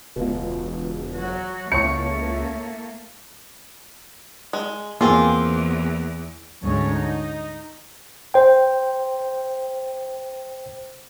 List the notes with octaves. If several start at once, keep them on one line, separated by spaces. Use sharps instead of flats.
E1 C#2 B2
F#3 F#4
C#2 A3 A#3 E4 C#5 C#6 C#7
G#3
E2 A#3 C4 F4 G#4
D2 G#2 C#4 C#5
D#4
C5 G5